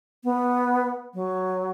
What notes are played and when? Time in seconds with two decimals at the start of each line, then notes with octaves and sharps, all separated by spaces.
0.24 B3
1.14 F#3